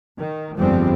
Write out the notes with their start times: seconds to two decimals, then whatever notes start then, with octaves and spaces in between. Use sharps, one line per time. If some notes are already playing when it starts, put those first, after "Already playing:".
0.20 D#3
0.57 G1 F2 F3 G3 G#3 C4